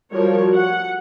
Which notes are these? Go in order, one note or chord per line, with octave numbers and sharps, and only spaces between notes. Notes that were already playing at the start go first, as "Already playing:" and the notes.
F3 G3 F#4 A#4 C#5
F#5